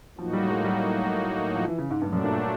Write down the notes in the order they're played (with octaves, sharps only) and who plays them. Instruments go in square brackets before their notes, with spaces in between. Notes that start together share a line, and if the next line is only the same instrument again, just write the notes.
[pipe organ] A2 F#3 A#3 D#4 F#4 [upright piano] F3
[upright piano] G3
G#3
G3
F3
E3
C#3
G#2
[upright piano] G2 [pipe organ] A#2 F#3 A3 D4
[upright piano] F#2
G2